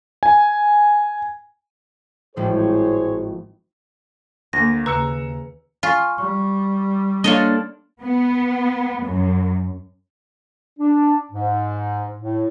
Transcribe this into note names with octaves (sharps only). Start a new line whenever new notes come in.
G#5
G#1 A2 F3 G#4 C5 C#5
D2 A#3 A#6
D#2 C#3 B4 A#5 E6 C#7
F4 G#5 C#6
G3 C#6
A#3 D4 F4 A4 C#5 D#5
B3
F#2
D4
G#2
A2